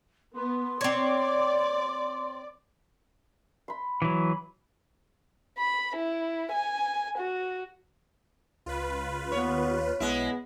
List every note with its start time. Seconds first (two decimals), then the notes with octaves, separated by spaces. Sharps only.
0.35 B3 C6
0.81 C4 C#5 D5
3.68 B5 C6
4.02 E3 F#3
5.58 B5
5.96 E4
6.53 G#5
7.18 F#4
8.66 C#2 F4 B4
9.32 D#2 B3 C#5
10.00 B1 G#3 B3 E4